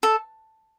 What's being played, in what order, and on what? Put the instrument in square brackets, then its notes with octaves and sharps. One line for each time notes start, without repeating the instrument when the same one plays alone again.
[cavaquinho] A4